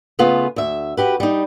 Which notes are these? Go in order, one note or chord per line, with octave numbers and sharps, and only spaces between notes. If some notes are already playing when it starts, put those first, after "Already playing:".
C#3 A3 B3 F4 G#4
D2 E5
F#4 G4 B4
G3 D#4